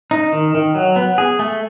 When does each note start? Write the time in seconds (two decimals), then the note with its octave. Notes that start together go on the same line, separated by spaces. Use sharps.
0.11 D#4
0.33 D#3
0.55 D#3
0.75 F#3
0.96 B3
1.18 G#4
1.39 A3